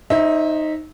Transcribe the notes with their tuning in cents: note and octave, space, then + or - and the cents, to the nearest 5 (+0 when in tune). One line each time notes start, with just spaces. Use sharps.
D#4 +0 C5 +35 E5 -20